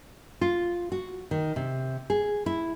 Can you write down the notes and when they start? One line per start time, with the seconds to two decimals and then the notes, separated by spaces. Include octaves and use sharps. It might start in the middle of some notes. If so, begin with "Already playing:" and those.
0.41 F4
0.92 F#4
1.31 D#3
1.56 C3
2.10 G#4
2.46 E4